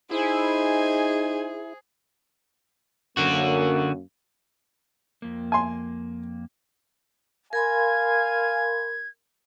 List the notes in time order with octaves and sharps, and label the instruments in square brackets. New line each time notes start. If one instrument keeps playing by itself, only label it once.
[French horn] D#4 [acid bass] E4 [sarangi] G#4 [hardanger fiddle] C5 G#5
[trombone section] F#2 A#3 [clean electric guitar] D3 F#4
[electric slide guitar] F2 A#3
[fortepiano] G#5 C6
[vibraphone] A#4 B5 C6 [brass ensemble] F5 G#5 [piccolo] G#6